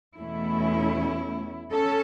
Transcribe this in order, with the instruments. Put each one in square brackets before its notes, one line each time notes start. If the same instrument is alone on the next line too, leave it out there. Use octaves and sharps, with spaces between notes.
[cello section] E2 B2 A3 C#4 E4
C#4 A4